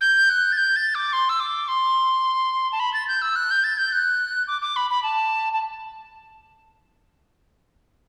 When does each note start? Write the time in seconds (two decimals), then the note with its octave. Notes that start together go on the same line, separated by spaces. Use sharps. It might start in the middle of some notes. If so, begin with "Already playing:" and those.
0.01 G6
0.30 F#6
0.52 A6
0.57 G6
0.76 A6
0.95 D6
1.13 C6
1.29 E6
1.40 D6
1.68 C6
2.72 A5
2.80 B5
2.94 A6
3.08 G6
3.22 E6
3.36 F#6
3.51 G6
3.64 A6
3.78 G6
3.92 F#6
4.48 D6
4.62 D6
4.76 B5
4.90 B5
5.03 A5
5.53 A5